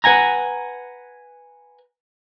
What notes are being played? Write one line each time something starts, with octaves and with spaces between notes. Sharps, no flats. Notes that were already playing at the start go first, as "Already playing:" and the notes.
B4 F#5 G#5 A#5